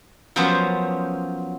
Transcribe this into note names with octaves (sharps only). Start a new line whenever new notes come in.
F3 F#3 B3 C#4 A#4 C5